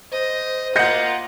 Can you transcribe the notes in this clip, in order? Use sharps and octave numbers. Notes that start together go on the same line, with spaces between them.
C5 D#5
A#3 F4 D#5 F#5 G6 A#6 C#7